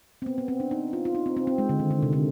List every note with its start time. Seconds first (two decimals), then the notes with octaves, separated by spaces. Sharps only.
0.22 C4
0.26 B3
0.38 B3
0.48 C4
0.60 D4
0.71 D#4
0.93 F4
1.05 F4
1.15 D#4
1.26 C4
1.37 C4
1.47 C4
1.58 G#3
1.69 D3
1.79 D#3
1.91 D3
2.02 C3
2.13 D3